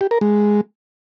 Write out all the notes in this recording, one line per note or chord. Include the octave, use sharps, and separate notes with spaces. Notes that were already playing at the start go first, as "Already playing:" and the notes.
G4
A#4
G#3